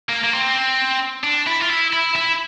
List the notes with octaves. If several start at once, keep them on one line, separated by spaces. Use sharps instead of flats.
A#3
A#3
C4
D4
E4
F4
E4
E4
E4